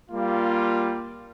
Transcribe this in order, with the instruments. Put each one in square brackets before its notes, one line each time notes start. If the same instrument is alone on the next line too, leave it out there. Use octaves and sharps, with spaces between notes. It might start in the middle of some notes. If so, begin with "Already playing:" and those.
[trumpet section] G3 A#3 F4